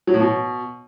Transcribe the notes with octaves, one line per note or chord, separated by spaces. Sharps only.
F#3
A2
B2